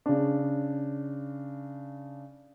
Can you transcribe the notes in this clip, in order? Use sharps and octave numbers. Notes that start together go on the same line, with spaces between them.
C#3 D4